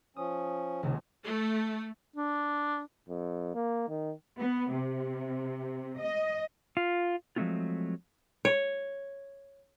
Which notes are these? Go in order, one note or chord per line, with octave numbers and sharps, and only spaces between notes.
F3 C#4 D#6
D#1 C#2 C3
A3
D4
F2
A#3
D#3
B3
C3
D#5
F4
F3 F#3 G#3 A3 C4 F4
C#5